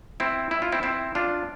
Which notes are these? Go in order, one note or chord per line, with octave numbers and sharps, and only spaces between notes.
C4 E4
E4
F4
C4 E4
C4 E4
D4 F4